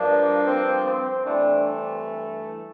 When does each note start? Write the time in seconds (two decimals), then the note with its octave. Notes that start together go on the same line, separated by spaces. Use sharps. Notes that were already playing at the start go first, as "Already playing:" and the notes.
Already playing: G2 F3 A#3 D4
0.43 C4
0.83 C4
1.24 G2 E3 A3 C4 D4